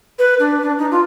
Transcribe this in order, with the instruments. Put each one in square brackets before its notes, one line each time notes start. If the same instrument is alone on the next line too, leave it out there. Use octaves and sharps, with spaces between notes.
[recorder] B4
D4
D4
D#4
F4